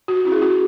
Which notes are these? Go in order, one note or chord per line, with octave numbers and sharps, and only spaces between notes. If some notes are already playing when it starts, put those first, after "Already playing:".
F#4
C#4 E4
G#4
F#4